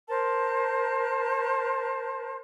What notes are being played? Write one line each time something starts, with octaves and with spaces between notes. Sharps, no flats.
A#4 C5 A5